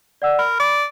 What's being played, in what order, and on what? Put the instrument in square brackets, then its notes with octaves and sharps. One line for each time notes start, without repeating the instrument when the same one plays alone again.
[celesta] D5 F#5 E6
[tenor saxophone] A#4 [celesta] B5
[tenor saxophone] D5